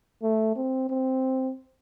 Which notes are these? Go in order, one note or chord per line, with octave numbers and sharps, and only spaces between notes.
A3
C4
C4